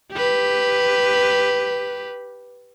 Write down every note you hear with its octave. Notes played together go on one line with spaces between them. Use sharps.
G4 B4